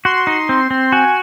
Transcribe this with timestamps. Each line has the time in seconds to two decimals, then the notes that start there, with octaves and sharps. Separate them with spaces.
0.05 F#4 C6
0.27 D#4
0.49 C4
0.71 C4
0.92 F#4 G#5